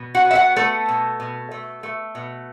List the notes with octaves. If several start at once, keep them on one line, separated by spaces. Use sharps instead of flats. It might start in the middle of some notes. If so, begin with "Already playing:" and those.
Already playing: B2
F#4 F#5
B3
E5
F#4 F#5
A3 B3 A4
B2
B2
A3
A3
B2